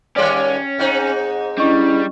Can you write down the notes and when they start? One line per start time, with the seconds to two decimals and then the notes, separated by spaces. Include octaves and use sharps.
0.16 D#2 G3 C#4 C#5 D5 G5
0.79 G#2 C4 D#4
1.58 G3 C#4 D4 E4 D#5 C#6